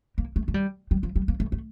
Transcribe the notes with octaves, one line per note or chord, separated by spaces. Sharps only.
A#3
A3
A3
G3
G3
F3
G3
A#3
A3
A3